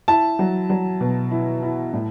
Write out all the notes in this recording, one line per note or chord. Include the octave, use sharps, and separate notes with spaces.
E4 A5
F#3
F#3
B2
E4
E4
A2